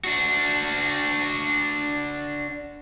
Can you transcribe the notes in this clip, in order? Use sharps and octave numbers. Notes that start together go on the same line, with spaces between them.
D4 F#4